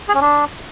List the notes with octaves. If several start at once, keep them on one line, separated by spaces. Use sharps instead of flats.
G#4
C#4
D4